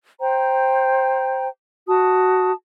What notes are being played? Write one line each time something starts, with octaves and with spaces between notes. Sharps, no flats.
C5 G5 A#5
F#4 A5 D#6